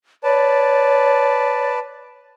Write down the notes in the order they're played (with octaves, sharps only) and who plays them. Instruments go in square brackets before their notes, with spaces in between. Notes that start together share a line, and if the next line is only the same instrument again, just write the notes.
[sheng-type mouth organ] B4 D5 A5 [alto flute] C#5